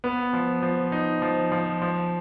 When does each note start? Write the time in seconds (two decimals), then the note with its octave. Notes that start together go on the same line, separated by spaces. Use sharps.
0.04 B3
0.33 F3
0.62 F3
0.92 D#4
1.22 F3
1.52 F3
1.82 F3